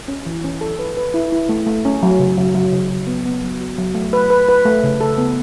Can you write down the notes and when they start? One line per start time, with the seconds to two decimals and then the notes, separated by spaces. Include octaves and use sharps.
0.08 C#4
0.26 E3
0.44 C#4
0.61 A4
0.79 B4
0.97 B4
1.14 E4
1.32 E4
1.49 A3
1.66 A3
1.85 C#4
2.03 F#3
2.19 C#3
2.38 F#3
2.55 F#3
2.72 C#3
2.91 F#3
3.07 B3
3.26 B3
3.43 F#3
3.61 F#4
3.78 F#3
3.95 A3
4.13 B4
4.30 B4
4.49 B4
4.65 A3
4.83 C#3
5.01 A4
5.18 B3